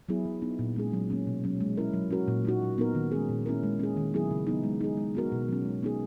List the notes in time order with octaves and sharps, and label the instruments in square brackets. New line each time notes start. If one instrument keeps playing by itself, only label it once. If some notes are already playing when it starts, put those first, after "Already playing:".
[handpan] F#3 B3 E4 G#4
F#3
B3 D#4
A#2
G#3 C#4 G#4
F#3
A#3 C#4
B2
F#3 C#4
G#3
C#4 E4 A#4
F#3
C#4 F#4 A#4
A#2
A#3 D#4 F#4
F#3
B3 D#4 A#4
D#3
G#3 C#4 G#4
A#2
A#3 C#4 E4 A#4
G#3
C#4 G#4
D#3
F#3 B3 E4 G#4
C#3
F#3 B3 D#4
G#3
D#4 G#4
G#3
B3 F#4 A#4
B2
F#3 C#4
G#3
B3 D#4 G#4